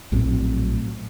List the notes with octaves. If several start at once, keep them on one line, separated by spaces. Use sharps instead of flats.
A#1 A2 F#3 C4